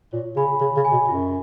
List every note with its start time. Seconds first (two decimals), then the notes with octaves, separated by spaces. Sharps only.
0.13 A#2 C#5
0.36 C#3 G#5 B5
0.60 C#3 C#5
0.76 C#3
0.84 G#5 B5
0.92 B2
1.08 F#2 F4